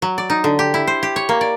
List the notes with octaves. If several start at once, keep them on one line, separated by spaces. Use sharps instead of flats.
F#3
D5
D#4
D3
G4
E4
C5
G4
C#5
A#3
D5